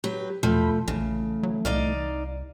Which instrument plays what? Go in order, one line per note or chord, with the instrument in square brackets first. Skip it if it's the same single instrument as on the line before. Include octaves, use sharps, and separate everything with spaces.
[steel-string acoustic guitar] F#3 B4 [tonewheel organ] G4
[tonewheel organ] E2 G5 B5 [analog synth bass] B2 [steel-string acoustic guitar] F3 A3
[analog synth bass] A#1 [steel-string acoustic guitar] C#3 [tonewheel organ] E3 A3
[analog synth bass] F#3
[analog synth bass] C2 [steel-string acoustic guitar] D#4 D5 F5